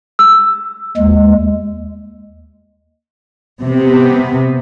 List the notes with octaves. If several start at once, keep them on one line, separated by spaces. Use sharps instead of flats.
E6
D#2 G#3
C3 B3